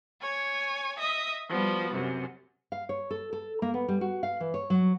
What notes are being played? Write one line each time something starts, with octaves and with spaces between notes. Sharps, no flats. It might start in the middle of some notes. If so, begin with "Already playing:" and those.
C#5 G#5
D#5 E5 D#6
F3 G3 B3 F#4
F#2 C3
F5
C#5
A4
A4
A#3
B3
G3
F#4
F5
E3
C#5
F#3